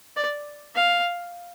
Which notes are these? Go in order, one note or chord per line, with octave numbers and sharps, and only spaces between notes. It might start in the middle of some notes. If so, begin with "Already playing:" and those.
D5
F5